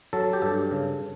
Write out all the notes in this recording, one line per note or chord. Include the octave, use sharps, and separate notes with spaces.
F#3 A4
G4
G2 A4
C#3